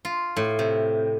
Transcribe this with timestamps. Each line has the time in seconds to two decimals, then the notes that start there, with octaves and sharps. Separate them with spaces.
0.05 F4
0.37 A2
0.59 C3